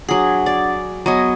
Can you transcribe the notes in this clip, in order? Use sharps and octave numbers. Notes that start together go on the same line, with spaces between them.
F#3 D4 G#4 F#5
D5
F#3 B3 C#5 D#5 G#5